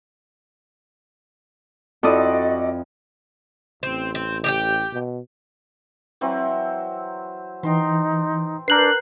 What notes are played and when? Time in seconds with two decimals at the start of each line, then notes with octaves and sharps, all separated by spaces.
2.03 F2 E4 F#4 A4 D5 D#5 D#6
3.83 A1 C4
4.15 C4
4.44 G4 G#4 G5
4.93 B2
6.21 E3 F#3 C4
7.63 E3 D#4 G5 A#5 C6
8.68 D4 A#4 B4 F#6 G6 C7